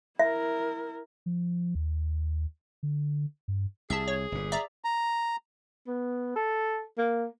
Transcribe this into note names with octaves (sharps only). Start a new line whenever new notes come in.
E4 A#4 E5
F3
D#2
D3
G2
C2 G#4 E5 A5
C#5
G1 A#2
D5 E5 A#5
A#5
B3
A4
A#3